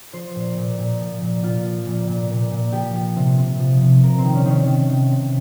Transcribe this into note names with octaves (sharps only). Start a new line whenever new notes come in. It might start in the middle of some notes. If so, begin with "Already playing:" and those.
F3 C5
A#2
A#2
A#2
F3
A#2
A#2 F4
F3
A#2
A#2
A#2
A#2
F3 G4
F3
C3
C3
F3
C3
C3 A#4
C4
D#3
C#4
D#3
C#4
D#3
C3
C3